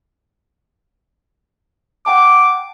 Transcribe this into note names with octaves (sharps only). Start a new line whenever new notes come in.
F#5 G5 A5 D6